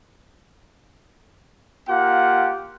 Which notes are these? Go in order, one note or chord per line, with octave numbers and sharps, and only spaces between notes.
A#3 F4 G4 F#5